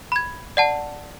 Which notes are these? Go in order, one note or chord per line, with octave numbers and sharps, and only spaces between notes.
B5 G#6
D5 F#5 A5